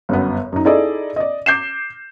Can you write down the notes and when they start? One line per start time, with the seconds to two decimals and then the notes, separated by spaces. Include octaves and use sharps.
0.09 G1 F#2 B3
0.52 F#2 D#4
0.65 D#4 E4 G#4 A4 D5 D#5
1.16 D5 D#5
1.46 D6 G6 C7 E7